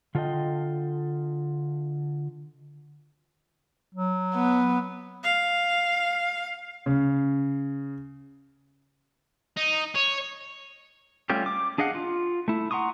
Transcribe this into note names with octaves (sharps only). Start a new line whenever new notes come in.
D3 F4 A4 A#4 D#5 G5
F#3
B3
F5
C#3
D#4
C#5
G3 A3 C#4 F4 G4
D6
D4 G#4 D#5 F5 F#5
F4
A3 E4
F#5 A#5 C6 C#6 D#6